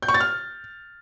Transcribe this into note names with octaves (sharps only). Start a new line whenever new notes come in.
G6
C#6
A6
F6